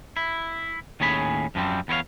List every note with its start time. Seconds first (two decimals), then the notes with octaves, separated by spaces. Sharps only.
0.17 E4
1.00 D#2 A2 C#4 G#4 B5
1.55 F#2 F3 G3 C4
1.88 E2 B3 E4 C#5 F5